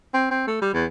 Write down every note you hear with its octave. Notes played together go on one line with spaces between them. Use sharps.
C4
C4
A3
G3
E2